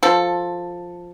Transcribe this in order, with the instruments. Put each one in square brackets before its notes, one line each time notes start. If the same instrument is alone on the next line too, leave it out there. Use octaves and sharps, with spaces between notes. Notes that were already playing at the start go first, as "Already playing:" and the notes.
[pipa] F3 A4